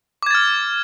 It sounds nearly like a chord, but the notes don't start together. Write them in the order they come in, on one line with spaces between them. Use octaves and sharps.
D6 G#6 A6 F6